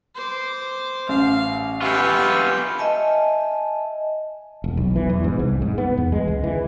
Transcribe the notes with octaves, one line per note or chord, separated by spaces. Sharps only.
C5 D6
A1 F5
B3 F4 G4 E5 G5 G#5 C#6
D#5 E5 G#5 A5
E1
B1
E3
E2
G#2
C2
G#2
B3
E2
G#3
C#2
E3